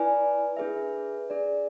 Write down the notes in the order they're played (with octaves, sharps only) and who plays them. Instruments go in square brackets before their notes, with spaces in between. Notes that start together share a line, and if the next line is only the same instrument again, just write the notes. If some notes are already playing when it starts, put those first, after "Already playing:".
Already playing: [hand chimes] E4 B4 D5 G#5
D4 G#4 B4 E5
D4 G#4 D5